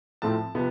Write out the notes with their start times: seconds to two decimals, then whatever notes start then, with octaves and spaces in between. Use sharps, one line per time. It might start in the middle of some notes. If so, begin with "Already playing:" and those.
0.22 A2 F3 A3 C4 A5
0.55 C3 F3 B3